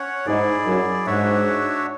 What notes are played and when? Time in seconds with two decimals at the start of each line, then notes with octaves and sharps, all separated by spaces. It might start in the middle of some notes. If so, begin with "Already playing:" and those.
Already playing: C#4 C#5 F#5
0.26 G#2 E4 G#4 D5
0.66 F#2
1.06 G#2 D4 F#4 C#5 E5